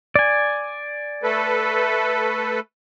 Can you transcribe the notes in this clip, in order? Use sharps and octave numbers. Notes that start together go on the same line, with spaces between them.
D5 G#5
A3 A4 B4